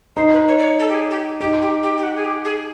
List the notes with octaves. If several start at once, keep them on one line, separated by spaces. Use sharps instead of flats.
D#4 C5
B4
C#5
D5
C#5
A4
G4
G#4
G4
D#4 G4
G4
G4
G4
F#4
G#4
G4
G#4